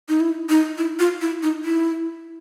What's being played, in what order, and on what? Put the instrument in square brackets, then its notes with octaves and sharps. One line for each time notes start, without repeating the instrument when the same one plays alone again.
[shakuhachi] D#4
E4
D#4
E4
F4
E4
D#4
E4